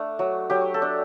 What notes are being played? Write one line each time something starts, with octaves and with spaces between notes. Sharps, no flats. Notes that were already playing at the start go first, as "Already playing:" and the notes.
Already playing: A3 D4
F#3
F#3 G4
A4
D4